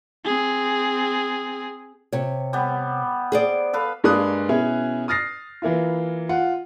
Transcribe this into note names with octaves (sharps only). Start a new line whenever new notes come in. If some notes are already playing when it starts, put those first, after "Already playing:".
C4 G#4
C3 C#5
G3 B3
G#4 C5 D5
A4 B4 F5
G2 G#3 A#3 D5 D#6 F#6
B2 C#4 E4 G#4
D#6 F6 A6 A#6 C7
E3 A#3 E4 F4
F4 F#5